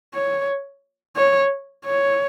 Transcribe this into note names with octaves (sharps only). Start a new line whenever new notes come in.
C#5
C#5
C#5